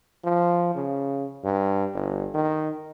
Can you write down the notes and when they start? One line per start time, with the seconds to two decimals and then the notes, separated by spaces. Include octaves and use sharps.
0.24 F3
0.75 C#3
1.44 G2
1.94 G1
2.34 D#3